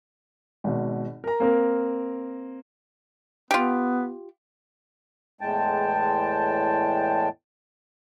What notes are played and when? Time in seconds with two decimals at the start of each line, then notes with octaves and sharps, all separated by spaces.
0.64 G#1 B2
1.24 A#4 A#5
1.40 A#3 C4 A#4
3.51 B3 F4 G4
5.41 E2 A2 G#3 G5 A5